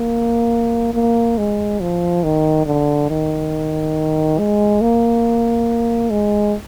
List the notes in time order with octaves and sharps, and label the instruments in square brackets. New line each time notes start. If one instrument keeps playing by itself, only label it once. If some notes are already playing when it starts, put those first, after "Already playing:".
Already playing: [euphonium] A#3
A#3
G#3
F3
D#3
D3
D#3
G#3
A#3
G#3